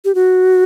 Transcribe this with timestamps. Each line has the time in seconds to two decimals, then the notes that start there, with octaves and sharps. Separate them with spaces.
0.05 G4
0.15 F#4